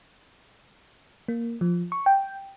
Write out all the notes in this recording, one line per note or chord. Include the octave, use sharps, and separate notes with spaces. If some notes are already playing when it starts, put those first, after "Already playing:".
A#3
F3
C#6
G5